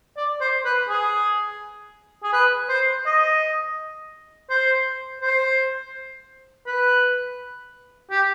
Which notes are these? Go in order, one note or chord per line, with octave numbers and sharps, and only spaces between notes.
D5
C5
B4
G#4
G#4
B4
C5
D#5
C5
C5
B4
G4